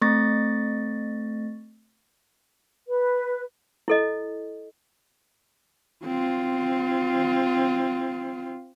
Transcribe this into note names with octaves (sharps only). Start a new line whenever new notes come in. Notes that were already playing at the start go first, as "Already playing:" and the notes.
A3 C4 C#6 A6 A#6
B4
E4 A4 D#5
C4 F4